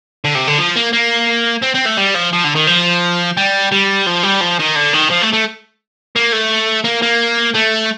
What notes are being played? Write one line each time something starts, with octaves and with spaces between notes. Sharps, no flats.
D3
C3
D3
F3
A#3
A#3
C4
C4
A3
G3
F3
F3
D3
D#3
F3
G3
G3
F3
G3
F3
D#3
D3
D#3
F3
A3
A3
A#3
A3
A#3
A#3
A3